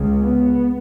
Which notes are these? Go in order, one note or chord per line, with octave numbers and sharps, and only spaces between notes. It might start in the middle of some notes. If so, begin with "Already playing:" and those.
Already playing: C#2 C#3
B3